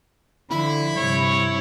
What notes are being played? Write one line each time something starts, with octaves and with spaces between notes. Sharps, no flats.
D3 F3 E4 B5
G2 C3 C#5